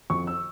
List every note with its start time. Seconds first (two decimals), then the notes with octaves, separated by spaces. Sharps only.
0.10 F2 C#6
0.27 E6